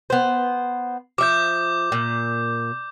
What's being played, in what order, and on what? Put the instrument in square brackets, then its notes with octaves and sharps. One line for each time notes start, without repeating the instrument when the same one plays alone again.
[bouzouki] B3 C5
[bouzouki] F3 E5 [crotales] D6 G6
[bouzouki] A#2